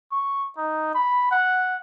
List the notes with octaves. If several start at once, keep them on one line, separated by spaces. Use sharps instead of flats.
C#6
D#4
B5
F#5